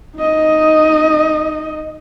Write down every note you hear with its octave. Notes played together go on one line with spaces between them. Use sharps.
D#4 D#5